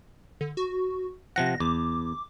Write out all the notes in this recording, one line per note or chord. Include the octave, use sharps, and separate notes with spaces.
D3
F#4
C3 F3 F#5 A#6
E2 D6